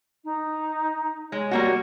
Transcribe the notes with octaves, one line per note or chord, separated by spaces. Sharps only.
D#4
G#3 C#5
G3 A#3 F#4